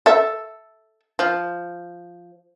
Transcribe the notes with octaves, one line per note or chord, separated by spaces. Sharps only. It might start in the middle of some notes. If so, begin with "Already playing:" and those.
A4 E5
F3